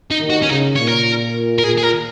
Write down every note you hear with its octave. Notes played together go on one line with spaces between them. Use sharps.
D#4
D#2 D#3
F#4
C#4
C#3 D#4
A#2 C#5
A#4
A#4
A#2 G#4
G#4
A#4